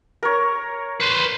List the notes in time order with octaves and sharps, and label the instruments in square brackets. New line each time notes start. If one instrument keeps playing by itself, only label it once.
[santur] A#4 C#5
[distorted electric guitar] B4 C5